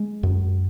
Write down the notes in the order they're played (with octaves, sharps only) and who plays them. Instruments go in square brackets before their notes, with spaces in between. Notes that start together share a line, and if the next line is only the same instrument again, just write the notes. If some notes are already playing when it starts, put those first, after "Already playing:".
Already playing: [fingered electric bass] G#3
F#2